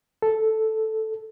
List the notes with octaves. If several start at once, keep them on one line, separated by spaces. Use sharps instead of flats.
A4